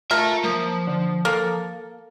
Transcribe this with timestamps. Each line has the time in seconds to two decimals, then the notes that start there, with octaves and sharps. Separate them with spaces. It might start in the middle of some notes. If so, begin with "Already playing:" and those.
0.11 F4 A#4 E5 A5
0.45 F3 A#3
0.87 D3
1.25 A#3 A4